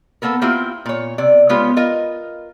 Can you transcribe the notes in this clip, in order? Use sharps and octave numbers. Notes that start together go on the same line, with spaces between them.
A#3 B3 A4 A#4
A#3 C4 E4 F4 G4
A#2 C#5
C3 D5
C#3 G#3 B3 F4 G4 C#5
F4 A#4 D#5